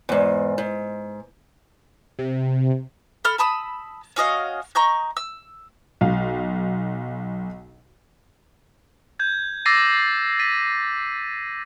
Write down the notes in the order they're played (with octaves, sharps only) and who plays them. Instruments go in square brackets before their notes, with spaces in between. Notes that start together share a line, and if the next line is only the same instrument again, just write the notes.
[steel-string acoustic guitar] E2 G#2
G#2
[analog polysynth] C3
[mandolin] A4 B5 F6
A5 B5 D#6 E6
C#4 F#4 D#5 F5
D#5 A#5 C#6 G6
E6
[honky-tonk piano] B1 F5
[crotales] G6 G#6
D6 E6 A6 A#6 C7 D#7
A6 B6 D#7